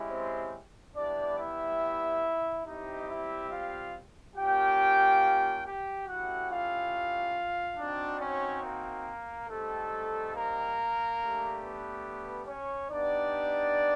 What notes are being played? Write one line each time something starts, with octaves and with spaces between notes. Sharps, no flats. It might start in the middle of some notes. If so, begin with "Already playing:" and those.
Already playing: G#3 C#4 E4 G4
C4 C5
G3 B3 D4 E4 G4 D5
E4 E5
G3 C4 D#4 E4 G4 D#5
E4 E5
F4 F5
A#3 C#4 F4 G4 G5
G4 G5
A3 C#4 E4 F#4 G4 F#5
F4 F5
C4 D4 D#4 F#4 D5
C#4 C#5
A#3 A#4
G3 A3 C4 D#4 G4 A4
A#3 A#4
A3 D4 G4
B3 B4
C#4 C#5
B3 D4 D#4 G4 D5